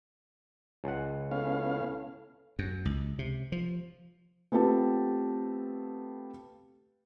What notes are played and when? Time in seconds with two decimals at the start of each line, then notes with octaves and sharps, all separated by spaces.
0.84 C#2 F#5
1.31 B3 C#4 E4 A4 F5
2.59 F#2
2.85 C#2
3.19 C3
3.52 F3
4.52 A3 B3 C4 F4 G4 A5